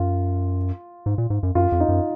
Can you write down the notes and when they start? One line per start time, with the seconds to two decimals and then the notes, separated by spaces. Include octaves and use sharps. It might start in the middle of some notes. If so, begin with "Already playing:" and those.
Already playing: F#2 F4
1.06 G#2
1.18 A#2
1.30 G#2
1.43 F#2
1.55 F#2 F4
1.72 F2
1.80 D#4
1.89 F#2